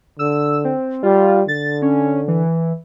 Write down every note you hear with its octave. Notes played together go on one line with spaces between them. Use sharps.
D3 E6
C4
G3 F4
D3 A6
C#4
E3